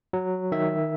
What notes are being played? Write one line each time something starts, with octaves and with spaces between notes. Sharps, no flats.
F#3
D#3 E5